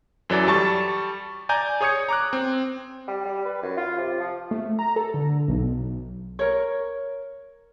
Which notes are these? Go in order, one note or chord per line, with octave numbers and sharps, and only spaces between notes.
F#2 E3 F#3 A4 D5
G3 A5 C#6 A6
D5 G#5 A#5 G6
G#4 C#5 D#6 G#6 C#7
A#5 D6 F#6
C4
G3
G3
B4
F#2
F4
C3
F3
A3
A#5
A4
D3
B1
A#4 C#5